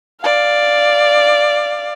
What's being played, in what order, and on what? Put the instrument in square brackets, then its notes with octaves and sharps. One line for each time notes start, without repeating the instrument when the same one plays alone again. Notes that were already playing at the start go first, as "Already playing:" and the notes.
[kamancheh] D5 F5